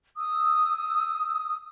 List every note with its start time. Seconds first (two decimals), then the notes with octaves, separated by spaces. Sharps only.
0.17 D#6 E6